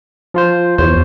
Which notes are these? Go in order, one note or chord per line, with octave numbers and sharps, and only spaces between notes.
F3 F4 C5
E2 C5 C#5